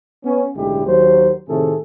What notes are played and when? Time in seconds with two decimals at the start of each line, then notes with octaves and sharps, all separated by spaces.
0.24 B3 C#4
0.55 B1 A2 D3 G#3 E4 G4
0.86 D#2 F#3 C5
1.48 A2 C3 D#3 A3 G#4 A4